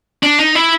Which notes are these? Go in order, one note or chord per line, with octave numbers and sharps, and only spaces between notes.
D4
D#4
E4